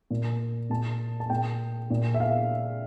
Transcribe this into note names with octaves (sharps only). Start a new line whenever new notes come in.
A#2
A#2 A5
A5
A#2 G5
A#2
E5
F5